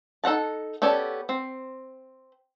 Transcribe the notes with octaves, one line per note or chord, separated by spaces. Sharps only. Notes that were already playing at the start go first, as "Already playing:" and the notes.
D#4 A4 C#5 F#5 A5
B3 C#4 G4 A4 D5
C4